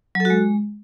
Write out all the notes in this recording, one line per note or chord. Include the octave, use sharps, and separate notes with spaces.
F#3
A4
F#4
G#3